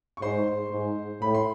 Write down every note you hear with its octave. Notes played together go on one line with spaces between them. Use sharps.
C#6
G#2 C5 C6
G#2
A2 B5
C6